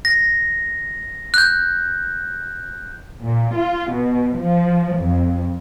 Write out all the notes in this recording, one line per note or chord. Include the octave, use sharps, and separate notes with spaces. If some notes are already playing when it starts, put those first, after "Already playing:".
A#6
F#6 G6
A#2
F4
B2
F3
F2